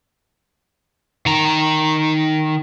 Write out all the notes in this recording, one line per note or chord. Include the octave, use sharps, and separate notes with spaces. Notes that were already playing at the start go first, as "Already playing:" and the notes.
D#3 A#5